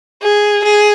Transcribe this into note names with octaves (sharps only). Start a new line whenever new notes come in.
G#4
G#4